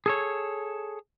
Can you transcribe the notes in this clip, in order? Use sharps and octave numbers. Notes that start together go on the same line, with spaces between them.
G#4 A4 C#5